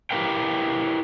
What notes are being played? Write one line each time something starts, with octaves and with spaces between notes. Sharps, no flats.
E4 G4 A#4 B4 F5 G5